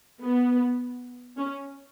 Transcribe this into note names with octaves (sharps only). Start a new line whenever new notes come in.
B3
C#4